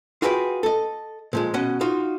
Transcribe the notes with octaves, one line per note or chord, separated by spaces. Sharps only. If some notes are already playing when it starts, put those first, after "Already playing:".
F4 F#4 G#4 B4 D5 G5
A4 D#5
A#2 F3 G#3
B2 C#4 D#5 F#5
D#4 F4 F#4